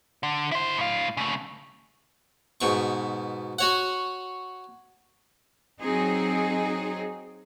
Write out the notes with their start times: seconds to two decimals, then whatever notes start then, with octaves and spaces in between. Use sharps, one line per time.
0.23 D3
0.52 E4 C5
0.77 A2 F5
1.17 C#3 A3
2.61 G#2 B2 C#6
3.59 F#4 C#5 F#5
5.81 F#3 C4 D#4 G#4